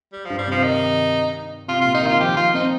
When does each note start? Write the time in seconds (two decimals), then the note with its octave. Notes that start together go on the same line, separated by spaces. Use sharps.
0.13 G3
0.25 F3
0.30 G2
0.38 G3
0.47 C3
0.51 F3
0.64 D#3 D#4
1.68 C3 F4
1.81 A#2 F4
1.94 D#4
2.02 D#3
2.07 F4
2.20 F3 G4
2.37 D#4 F4
2.54 C4 D#4